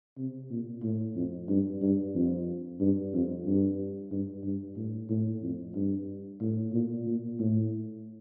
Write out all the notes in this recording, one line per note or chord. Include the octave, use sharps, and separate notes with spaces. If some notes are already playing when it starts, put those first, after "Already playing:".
C3
A#2
A2
F2
G2
G2
F2
G2
F2
G2
G2
G2
A2
A2
F2
G2
A2
A#2
A#2
A2